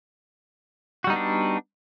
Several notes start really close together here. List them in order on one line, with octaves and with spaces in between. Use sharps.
F#4 G3 D#4 B3 D4